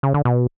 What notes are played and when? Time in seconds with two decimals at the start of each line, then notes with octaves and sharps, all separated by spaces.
0.03 C#3
0.14 D3
0.25 B2